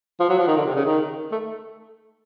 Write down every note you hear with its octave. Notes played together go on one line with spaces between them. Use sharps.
F3
F#3
F3
D#3
D3
C3
C#3
D#3
A3